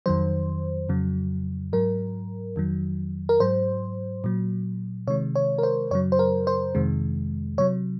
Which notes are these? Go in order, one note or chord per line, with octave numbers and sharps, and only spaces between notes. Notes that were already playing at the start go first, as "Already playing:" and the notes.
F2 D#3 F#3 C5
F2 C#3 F#3
G#2 F#3 A#4
F2 D#3 F#3
A#4
G#2 F#3 C5
A#2 F#3
C3 D#3 G#3 C#5
C#5
A#4
C5
F#2 C#3 F#3 C#5
C5
A#4
C5
F2 C3 D#3 G#3
C3 F#3 C#5